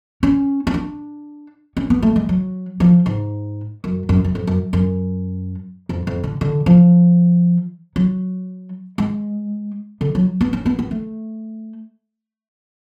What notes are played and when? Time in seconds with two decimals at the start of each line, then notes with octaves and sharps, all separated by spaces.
0.23 C#4
0.67 C#4
0.74 D4
1.77 C#4
1.90 B3
2.02 A3
2.16 G#3
2.29 F#3
2.80 F3
3.06 G#2
3.84 F#2
4.09 F#2
4.24 F#2
4.35 F2
4.47 F#2
4.73 F#2
5.89 F2
6.07 F2
6.23 D3
6.41 D3
6.66 F3
7.96 F#3
8.98 G#3
10.01 D3
10.15 F#3
10.41 B3
10.53 C#4
10.66 B3
10.79 B3
10.91 A3